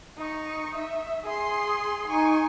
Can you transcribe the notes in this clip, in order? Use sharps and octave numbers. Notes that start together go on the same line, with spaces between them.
D#4 C#6
E5
G#4 C6
D#4 G#5 C#6